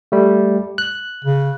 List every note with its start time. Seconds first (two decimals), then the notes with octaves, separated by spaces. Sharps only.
0.12 G3 A3
0.78 F#6
1.24 C#3